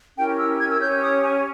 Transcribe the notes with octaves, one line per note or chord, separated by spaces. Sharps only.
C#4 E4 G4 A#4 G5
E6
G#6
E6
C#4 G4 C#5 G6
D#6
G#5